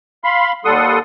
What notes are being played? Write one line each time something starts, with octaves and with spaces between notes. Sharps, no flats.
F5 B5 C6
D#2 G3 A4 F#5 C6 D#6